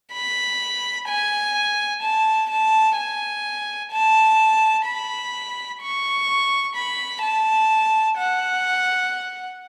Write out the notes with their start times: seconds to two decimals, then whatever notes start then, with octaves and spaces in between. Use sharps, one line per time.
0.12 B5
1.08 G#5
2.02 A5
2.50 A5
2.97 G#5
3.91 A5
4.86 B5
5.81 C#6
6.75 B5
7.23 A5
8.18 F#5